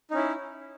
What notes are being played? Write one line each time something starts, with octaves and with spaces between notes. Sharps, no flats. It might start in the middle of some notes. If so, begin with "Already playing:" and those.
C#4 D#4 E4